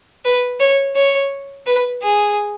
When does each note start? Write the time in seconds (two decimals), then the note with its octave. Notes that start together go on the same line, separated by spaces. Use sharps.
0.25 B4
0.60 C#5
0.96 C#5
1.67 B4
2.03 G#4